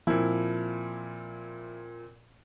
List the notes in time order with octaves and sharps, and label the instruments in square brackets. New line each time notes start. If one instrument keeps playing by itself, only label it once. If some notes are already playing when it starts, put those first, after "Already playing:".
[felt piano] A#2 C4 [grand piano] F3 E4 A#4